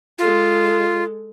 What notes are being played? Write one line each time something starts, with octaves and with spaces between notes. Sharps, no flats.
G#3 F4 A4